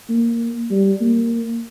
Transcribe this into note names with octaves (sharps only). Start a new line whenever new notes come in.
A#3
G3
A#3